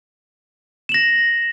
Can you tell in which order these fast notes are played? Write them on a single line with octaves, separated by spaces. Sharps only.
E7 F#7 A#6